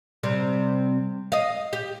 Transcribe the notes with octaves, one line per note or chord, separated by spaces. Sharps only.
C3 G3 C4
D#5 F5
G4